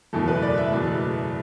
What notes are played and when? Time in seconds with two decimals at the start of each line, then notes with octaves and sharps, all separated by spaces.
0.13 F#1 E2 B2 A3 A4
0.28 B4
0.42 D5
0.57 E5
0.72 F#1 E2 B2 A3